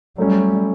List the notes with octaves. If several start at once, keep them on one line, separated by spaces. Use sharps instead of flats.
F#3 G3 A3 C#4